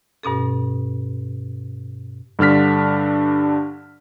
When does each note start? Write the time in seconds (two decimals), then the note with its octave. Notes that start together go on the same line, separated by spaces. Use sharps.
0.23 G2 B2 C#4 A4
2.39 G2 D3 D4 F6 B6